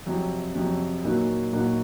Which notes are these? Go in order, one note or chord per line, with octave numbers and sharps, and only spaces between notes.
F2 C3 F#3
F2 C3 F#3
A#2 F#3 A#3 D#4 F#4
A#2 F#3 A#3 D#4 F#4